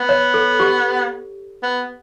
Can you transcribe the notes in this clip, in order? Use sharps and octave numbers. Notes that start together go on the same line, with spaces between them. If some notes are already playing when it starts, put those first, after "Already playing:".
Already playing: B3
C#5
A4
G4
B3